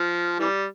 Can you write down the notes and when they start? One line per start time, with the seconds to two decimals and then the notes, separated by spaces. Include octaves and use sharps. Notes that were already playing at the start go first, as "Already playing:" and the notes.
Already playing: F3
0.40 E3 G3